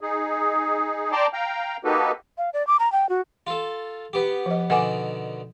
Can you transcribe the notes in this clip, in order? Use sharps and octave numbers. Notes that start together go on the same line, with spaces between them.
D#4 G#4
D5 G5 A5 A#5 C6 D6
F5 G5 A#5
A#3 D#4 F#4 G4 A4 B4
F5
D5
D6
A#5
G5
F#4
F4 A4
B3 G4
F3 D#5
B2 D3 D#3 F#5 G#5 D6